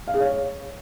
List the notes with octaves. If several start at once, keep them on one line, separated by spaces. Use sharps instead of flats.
F5
G#4
C#5